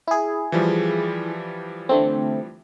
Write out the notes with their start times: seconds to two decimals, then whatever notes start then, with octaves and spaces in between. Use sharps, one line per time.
0.07 E4 G#4
0.52 E3 F3 G3
1.89 D3 A3 C4